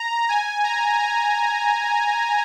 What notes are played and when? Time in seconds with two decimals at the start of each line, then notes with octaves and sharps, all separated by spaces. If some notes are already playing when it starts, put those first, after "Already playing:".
Already playing: A#5
0.29 G#5
0.64 A#5
0.97 A#5